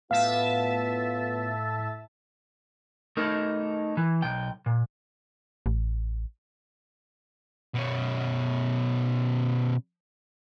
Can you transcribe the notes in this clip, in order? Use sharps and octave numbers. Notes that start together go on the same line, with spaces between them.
A2 B3 F4 E5 F5 A5
A3 D#4 A#4
E3
B1 G5
A#2
A1
B2 C#4